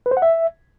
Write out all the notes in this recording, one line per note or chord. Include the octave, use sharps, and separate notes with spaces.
B4
C5
F#5
E5